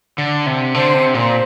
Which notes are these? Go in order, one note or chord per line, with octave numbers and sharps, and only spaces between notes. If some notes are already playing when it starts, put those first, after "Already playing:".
D3
C3
D3 C5
C3
A#2 C5